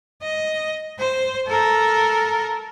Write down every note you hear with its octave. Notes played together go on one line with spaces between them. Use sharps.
D#5
C5
A4 A#4